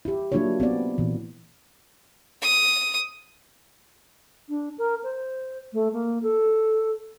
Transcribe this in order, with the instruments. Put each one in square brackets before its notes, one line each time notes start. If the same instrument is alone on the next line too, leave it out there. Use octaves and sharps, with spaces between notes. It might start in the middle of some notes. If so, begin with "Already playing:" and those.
[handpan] E4 G4
F#3 A#3 D4 E4 F4 C#5
B3 C4 D5
A#2 E3
[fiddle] D#6
[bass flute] D4
A#4
C5
A3
A#3
A4